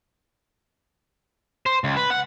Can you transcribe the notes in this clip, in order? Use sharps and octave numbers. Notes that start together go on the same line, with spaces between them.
C5
C#2
B4
F#5